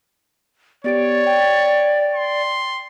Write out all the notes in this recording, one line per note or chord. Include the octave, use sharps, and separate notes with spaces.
B3 G4 C#5 D5 D7
G5
C6